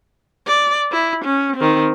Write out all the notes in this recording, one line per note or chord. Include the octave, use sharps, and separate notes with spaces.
D5
E4
C#4
D#3 C4